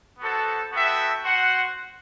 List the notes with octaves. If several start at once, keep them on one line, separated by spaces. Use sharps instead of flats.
B3 F#4 A4 C5
B3 F#4 A4 E5 G5
F#4 C5 F#5